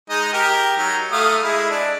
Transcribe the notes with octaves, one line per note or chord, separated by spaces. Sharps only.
G#3 D#4 D#5
G4 A#4
F#3 D#4
A3 F5 D#6
G#3 E4 G#4
D4